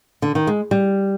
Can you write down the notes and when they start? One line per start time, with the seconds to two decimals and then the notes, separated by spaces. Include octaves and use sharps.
0.22 D3
0.35 D#3
0.47 G#3
0.71 G3